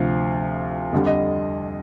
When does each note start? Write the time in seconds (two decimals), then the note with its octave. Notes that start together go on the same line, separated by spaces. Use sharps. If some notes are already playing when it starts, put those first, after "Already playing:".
Already playing: D2 C3 F3 F5
0.93 F2 D3 G3
1.06 D#5